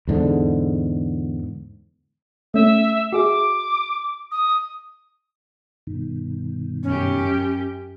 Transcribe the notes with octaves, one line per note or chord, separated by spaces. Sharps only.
E2 G#2 D3
A3 C#4 E5
F#4 G#4 E5 D6
D#6
G2 B2 D#3
F#2 C#4 G4